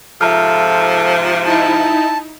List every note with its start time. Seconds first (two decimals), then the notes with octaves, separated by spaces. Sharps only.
0.21 G#2 C3 F3 A4 E5 A#5 F6
1.46 D#4 E4 A5